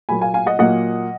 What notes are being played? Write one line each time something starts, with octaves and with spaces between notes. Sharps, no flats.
A#2 F#3 A#3 G#5 B5
F5 G#5
F5 G#5
D#5 F#5
A#2 F#3 A#3 D#5 F#5